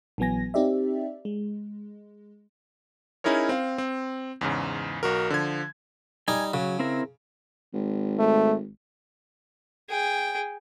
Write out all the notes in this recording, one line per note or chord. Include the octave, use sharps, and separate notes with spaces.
A#1 E3 F#3 B3 G#5 A#6
C4 D#4 G4 D5 E5
G#3
C#4 D#4 E4 G#4 A#4 C#5
C4 F5
C4
E2 G#2 C#3
B1 F#4 A#4
D3 F3 G#6
G3 D#4 G#5
C#3 F#3
C4 E4 A#4
G#1
A3
G#4 G5